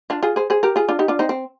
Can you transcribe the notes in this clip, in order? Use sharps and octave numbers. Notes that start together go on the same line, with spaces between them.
D4 F4
F4 G#4
G#4 C5
G#4 C5
G4 A#4
F4 G#4
D4 F4
D#4 G4
D4 F4
C4 D#4
C4